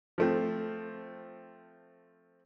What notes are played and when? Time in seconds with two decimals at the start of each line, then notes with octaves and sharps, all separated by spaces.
0.18 F3 A3 C4